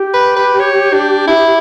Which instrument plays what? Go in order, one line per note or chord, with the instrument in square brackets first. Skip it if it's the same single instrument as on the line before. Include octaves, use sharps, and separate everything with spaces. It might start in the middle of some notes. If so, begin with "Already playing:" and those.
Already playing: [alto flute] G4
[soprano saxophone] B4
B4
C#5
D4
E4